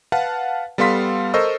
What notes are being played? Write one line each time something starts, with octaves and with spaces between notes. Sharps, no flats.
B4 F5 F#5 A5
G3 B3 A4 F5 C6 B6
A4 A#4 C5 D#5 C#6 E6